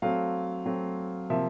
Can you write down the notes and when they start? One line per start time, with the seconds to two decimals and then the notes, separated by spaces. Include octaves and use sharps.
0.02 F#3 A3 C4 F5
0.66 F#3 A3 C4
1.30 C3 F3 A#3 E5